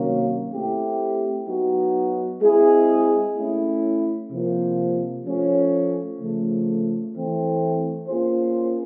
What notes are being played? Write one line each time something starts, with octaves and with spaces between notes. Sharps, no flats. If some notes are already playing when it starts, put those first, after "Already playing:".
Already playing: C3 D#3 F#3 A#3 C#4
A3 C4 E4 G4
F#3 B3 D#4 F#4
G#3 C4 E4 G#4
A3 C#4 E4
C3 F3 A#3
F3 A3 C#4
C#3 F3 A3
E3 A3 C4
A#3 C#4 F4 G#4 C5